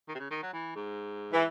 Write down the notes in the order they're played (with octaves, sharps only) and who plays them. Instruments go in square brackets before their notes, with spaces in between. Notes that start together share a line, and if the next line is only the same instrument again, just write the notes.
[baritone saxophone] D#3
C3
C#3
D#3
F#3
E3
G#2
[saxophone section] E3